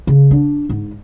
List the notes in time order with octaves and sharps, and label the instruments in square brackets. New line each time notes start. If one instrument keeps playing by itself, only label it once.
[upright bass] C#3
D4
G#2